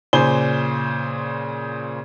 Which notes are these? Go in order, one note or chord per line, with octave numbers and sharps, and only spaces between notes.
A#2 C#3 C5 G#5 G7